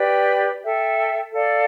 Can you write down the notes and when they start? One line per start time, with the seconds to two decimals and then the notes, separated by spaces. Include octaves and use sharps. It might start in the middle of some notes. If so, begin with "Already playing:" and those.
Already playing: G4 B4 D5 G5
0.63 A4 E5 G5
1.33 A4 D5 F5